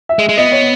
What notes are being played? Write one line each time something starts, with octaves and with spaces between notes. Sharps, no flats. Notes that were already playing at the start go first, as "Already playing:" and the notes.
E5
G#3
G#3
B3 D#5
C#5